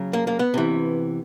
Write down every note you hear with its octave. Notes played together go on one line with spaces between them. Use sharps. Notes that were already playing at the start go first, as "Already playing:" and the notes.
Already playing: C#3 F#3
A#3
A#3
B3
C3 E3